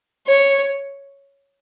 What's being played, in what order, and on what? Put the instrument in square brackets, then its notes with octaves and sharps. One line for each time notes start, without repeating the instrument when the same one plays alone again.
[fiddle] C#5